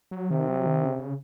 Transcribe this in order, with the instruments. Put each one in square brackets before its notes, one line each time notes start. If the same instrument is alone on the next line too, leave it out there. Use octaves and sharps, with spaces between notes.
[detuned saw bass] F#3
[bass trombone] C3 [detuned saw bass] D#3
[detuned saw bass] F#3
D#3
C#3
C#3